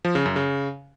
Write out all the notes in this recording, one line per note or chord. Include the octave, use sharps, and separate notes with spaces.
F3
C#3
F#2
C#3